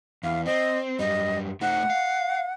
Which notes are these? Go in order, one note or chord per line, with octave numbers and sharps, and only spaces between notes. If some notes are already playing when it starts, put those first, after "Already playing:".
E2 F5
C4 D#5
F#2 G3 D#5
A3 D#4 F#5
F5